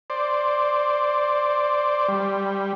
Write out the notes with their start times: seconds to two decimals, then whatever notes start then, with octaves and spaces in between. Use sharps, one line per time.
0.10 C5 D5
2.08 G3